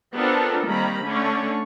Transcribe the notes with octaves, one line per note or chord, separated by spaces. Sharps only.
B3 C4 D4 F4 A4 A#4
D#3 G3 A#3 C4 A#5 B5
D3 A3 C#4 D4 C#5